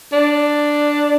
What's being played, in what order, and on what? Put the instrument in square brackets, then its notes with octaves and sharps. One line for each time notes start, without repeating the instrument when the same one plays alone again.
[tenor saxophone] D4